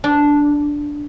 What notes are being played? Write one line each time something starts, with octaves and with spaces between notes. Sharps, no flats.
D4